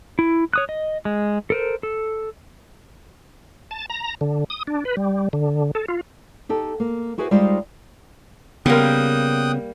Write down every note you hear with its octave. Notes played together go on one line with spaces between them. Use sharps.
E4
C#5 D#6 F#6
D#5
G#3
A4 A#4 C5
A4
A5
A#5
D3
D#6
D4
B4
G3
D3
A4
F4
D#4 G4 A4
A#3
E4 F#4 G#4 B4 C5
G3 G#3 D#4 F4 G4 C5
C#3 G3 A#3 B3 G5 D#6 F#6